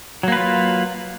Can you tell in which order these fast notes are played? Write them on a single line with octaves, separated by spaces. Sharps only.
F#3 A#3 B4 F4